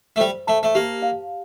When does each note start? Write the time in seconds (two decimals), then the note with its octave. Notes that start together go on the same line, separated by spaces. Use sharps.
0.16 A3
0.20 G3 C5
0.47 A3 A5
0.63 A3
0.75 A#3 G4
1.02 F5